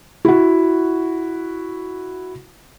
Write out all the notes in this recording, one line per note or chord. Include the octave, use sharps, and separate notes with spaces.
E4 F#4